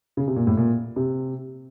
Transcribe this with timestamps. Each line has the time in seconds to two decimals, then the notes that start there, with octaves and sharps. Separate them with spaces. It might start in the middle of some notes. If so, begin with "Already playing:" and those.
0.17 C#3
0.28 C3
0.36 A#2
0.47 A2
0.57 A#2
0.96 C3